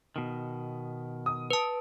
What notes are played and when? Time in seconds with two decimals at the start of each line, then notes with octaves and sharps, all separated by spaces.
0.16 B2 D#3
1.26 D#6
1.51 B4 A5